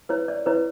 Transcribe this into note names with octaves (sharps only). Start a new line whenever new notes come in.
E4 B4 C#5
D5
E4 B4 C#5